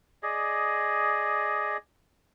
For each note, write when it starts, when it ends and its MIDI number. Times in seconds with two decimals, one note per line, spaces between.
0.23 1.77 68
0.23 1.77 74
0.23 1.77 75